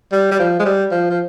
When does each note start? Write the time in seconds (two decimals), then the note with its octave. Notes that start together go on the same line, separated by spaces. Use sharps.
0.12 G3
0.31 G3
0.39 F3
0.59 G#3
0.65 G3
0.92 F3
1.10 F3